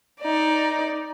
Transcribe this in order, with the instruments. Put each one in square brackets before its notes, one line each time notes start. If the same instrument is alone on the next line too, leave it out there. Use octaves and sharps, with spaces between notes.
[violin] D#4 D5